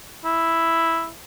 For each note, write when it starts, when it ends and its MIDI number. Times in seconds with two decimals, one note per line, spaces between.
0.25 1.09 64